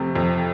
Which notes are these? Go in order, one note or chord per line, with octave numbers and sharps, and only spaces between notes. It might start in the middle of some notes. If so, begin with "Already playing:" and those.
Already playing: F2 C3 A3
F2